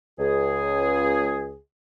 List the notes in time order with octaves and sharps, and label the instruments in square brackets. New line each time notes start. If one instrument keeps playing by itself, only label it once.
[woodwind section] C#2 G#4